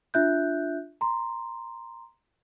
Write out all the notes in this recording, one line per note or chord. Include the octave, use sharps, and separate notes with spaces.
D4 F4 E5 F#6 G6
A#5 C6